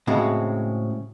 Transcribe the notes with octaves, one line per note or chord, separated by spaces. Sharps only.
A2 C#3 G#3 C4 F#4